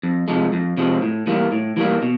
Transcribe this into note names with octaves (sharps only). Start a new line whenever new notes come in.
F2
C3 F3 G#3
F2
C3 F3 G#3
A2
E3 G3 A#3
A2
E3 G3 A#3
B2